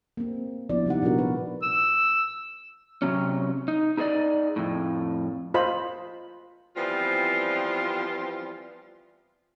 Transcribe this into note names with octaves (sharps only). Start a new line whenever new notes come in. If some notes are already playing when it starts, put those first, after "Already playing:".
A#3 C4
F3 B3 D4 E4 F4 D5
C3 G3 D#4 F#5
A#2 F3 B3 D4 F#4 A#4
B4
E6
C3 F#3 C#4
D#4
D#4 G#4 A#4 C5 D5 D#5
F2 A2
F4 C5 D#5 B5
E3 F3 G3 B3 C4 F4